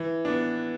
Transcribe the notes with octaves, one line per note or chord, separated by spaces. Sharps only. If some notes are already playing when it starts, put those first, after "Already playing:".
Already playing: E3
D4
B3